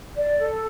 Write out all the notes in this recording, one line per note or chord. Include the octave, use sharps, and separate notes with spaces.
D5
A4